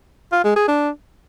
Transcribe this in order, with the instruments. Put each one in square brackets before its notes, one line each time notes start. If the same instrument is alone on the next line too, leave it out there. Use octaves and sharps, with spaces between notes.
[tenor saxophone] F4
G#3
G#4
D4